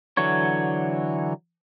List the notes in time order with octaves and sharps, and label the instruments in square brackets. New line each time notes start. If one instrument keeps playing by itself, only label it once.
[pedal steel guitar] D3 E3 F#3 C#5